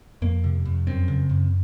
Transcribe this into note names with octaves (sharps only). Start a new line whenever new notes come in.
F2 A#3
C3
F2
F#2 C4
C#3
F#2